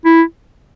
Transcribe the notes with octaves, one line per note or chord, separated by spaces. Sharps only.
E4